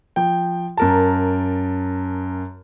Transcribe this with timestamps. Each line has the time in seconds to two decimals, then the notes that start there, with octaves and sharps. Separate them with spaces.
0.16 F3 G5
0.77 F#2 A#4 A5